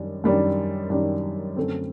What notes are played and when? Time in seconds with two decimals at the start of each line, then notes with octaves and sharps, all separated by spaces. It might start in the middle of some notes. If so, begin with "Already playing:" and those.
Already playing: F#2 D#3 G3 D4
0.24 F#2 D#3 G3 D4
0.90 F#2 D#3 G3 D4
1.56 F#2 D3 A3 C4